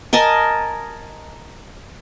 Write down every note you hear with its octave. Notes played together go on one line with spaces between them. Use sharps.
A#4 D#5 G#5 A5